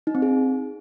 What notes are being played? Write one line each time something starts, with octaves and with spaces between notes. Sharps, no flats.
D#4
C4
G#4